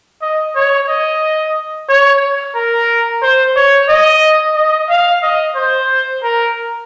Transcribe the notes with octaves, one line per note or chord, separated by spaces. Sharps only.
D#5
C#5
D#5
C#5
A#4
C5
C#5
D#5
D#5
F5
D#5
C5
A#4